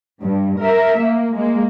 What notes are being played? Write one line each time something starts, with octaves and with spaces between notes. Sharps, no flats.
G2
A#4 E5
A#3
G#3 A#3